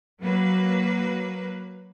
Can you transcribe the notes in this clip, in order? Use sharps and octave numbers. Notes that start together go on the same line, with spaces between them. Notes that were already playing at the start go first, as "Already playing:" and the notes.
F#3 A#3 B4